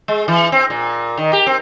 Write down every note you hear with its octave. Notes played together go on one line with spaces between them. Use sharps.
G#3
E3
C4
A#2
D#3
G4
C4